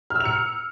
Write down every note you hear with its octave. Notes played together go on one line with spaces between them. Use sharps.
F6
E6
F7
C#7